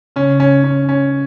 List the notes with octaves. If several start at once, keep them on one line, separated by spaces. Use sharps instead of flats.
C#3 C#4
C#4
C#4
C#4